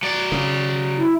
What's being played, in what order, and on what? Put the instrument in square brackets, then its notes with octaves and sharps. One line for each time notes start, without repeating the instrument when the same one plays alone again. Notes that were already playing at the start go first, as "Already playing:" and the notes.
[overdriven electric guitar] F#3 D5
[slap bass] C#3
[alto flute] E4